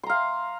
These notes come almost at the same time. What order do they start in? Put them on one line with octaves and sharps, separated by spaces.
C6 A#5 F5